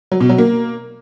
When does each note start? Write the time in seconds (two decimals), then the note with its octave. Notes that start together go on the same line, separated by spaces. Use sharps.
0.12 F#3
0.20 B2
0.29 F#3
0.38 A#3